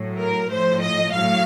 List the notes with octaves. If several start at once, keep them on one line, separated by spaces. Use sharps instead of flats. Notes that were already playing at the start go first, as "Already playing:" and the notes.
Already playing: A2 F#3
A#4
A2 F3 C5
D#5
A2 F#3 F5